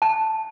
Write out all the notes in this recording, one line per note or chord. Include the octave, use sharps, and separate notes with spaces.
A5